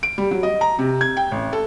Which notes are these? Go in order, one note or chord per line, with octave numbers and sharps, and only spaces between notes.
D7
G3
F#3
D#5
A#5
C3
G#6
G5
A1
A4